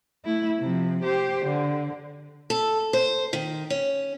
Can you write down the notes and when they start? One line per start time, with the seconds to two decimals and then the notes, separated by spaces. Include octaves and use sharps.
0.25 A3 E4
0.59 C3 F3
1.03 G4 C5
1.45 D3
2.50 A4
2.93 C5
3.33 D#3
3.70 C#4